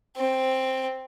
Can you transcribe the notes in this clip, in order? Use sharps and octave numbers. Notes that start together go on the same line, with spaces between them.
C4